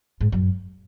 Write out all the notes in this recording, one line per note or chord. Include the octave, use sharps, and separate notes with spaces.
G#2
F#2